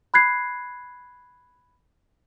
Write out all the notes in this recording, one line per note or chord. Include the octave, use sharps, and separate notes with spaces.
B5 F#6 G#6 C7